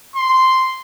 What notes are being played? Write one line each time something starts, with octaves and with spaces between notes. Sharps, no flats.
C6